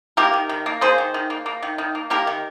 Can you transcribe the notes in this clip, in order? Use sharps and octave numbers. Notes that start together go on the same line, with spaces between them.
A#3 G4 A#4
D#3
D#3
A#3
A#3 G#4 C5
D#3
D#3
A#3
A#3
D#3
D#3
A#3
A#3 G4 A#4
D#3